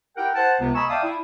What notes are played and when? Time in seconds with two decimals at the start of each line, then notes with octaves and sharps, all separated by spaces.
0.16 E4 G4 A#4 F#5 G5
0.35 C5 F#5 A5
0.59 C#2 C3 B3
0.75 D#5 G#5 A#5 B5 C#6 E6
0.89 D5 E5 F5 G5 A5 D#6
1.04 E4